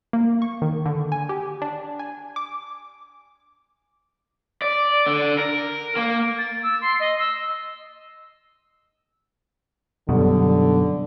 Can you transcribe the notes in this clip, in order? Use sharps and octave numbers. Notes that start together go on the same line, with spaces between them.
A#3
C#6
D#3
D3
G#5
G4
D4
G#5
D6
D5
D3
A#4
A#3
A6
E6
C6
D#5
E6
F#2 B2 D3 G3